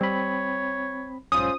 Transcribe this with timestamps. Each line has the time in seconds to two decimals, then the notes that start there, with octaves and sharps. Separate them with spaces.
0.01 G3 C4 C#5 B5
1.32 B1 G#2 C#4 F4 C5 D#6